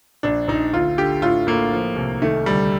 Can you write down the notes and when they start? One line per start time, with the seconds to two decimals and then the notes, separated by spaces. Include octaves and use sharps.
0.23 A#1 D4
0.48 A#1 D#4
0.73 D2 F4
0.97 D3 G4
1.22 A2 F4
1.47 A2 A#3
1.72 F3
1.96 C2
2.22 D#3 A3
2.46 D2 G3